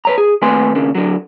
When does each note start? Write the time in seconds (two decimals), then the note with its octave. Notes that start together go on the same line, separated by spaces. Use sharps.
0.05 B4 C#5 A#5
0.18 G#4
0.42 D#2 A3 C4 B4 G#5 C6
0.75 D#2 C#3 A#3
0.95 D3 F#3